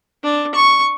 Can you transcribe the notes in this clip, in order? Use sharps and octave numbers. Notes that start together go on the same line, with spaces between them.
D4
C#6